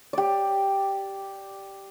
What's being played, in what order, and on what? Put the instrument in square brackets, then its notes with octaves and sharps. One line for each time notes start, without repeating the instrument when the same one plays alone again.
[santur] G4 D5